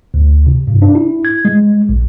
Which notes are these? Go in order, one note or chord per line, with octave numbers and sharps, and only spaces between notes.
D2
C3
G2
D4
E4
G#6
G#3
A#1